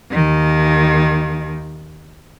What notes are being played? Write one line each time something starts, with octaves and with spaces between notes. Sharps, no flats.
D#2 D#3